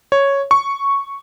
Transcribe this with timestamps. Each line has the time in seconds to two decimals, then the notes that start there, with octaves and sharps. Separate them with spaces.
0.12 C#5
0.51 C#6